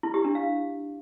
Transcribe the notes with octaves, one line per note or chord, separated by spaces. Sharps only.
E4
G4
D4
F5